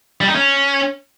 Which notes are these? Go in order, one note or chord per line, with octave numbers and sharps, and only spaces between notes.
G3
D#4
C#4